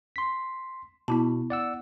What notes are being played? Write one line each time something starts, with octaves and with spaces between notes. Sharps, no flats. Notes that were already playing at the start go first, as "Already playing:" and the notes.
C6 B6
B2 B3 E4 A5
D5 F#5 E6